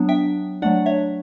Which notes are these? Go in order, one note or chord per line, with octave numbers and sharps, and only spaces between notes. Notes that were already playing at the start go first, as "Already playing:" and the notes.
Already playing: F#3 B3 D4
E5 G5
F#3 A3 D4 D5 F#5
C#5 E5